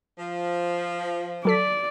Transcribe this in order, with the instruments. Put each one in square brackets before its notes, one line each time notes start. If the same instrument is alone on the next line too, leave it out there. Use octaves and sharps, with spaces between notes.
[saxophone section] F3
[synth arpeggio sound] F#3 A4 B6 [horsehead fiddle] D5